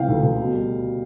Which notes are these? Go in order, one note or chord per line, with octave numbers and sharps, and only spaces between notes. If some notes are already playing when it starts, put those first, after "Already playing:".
Already playing: C#2 C3 E3 F5 G5
D2
D2
B2
G3